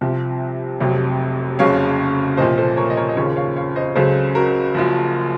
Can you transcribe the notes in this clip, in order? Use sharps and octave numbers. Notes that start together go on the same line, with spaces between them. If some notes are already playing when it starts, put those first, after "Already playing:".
C2 C3 F3
F1 F2 C3 F#3
F#1 F2 C#3 F#3 C#5 F5
C2 A#2 F3 C5 D#5
A4 C5
A#4 C#5
D#5
A#4 C#5
D#5
D#2 C#3 F3 A#4 C#5
C#5 F5
C#5 F5
C5 D#5
C#2 C#3 F#3 A4 C5
F#4 A#4
F#1 F#2 F3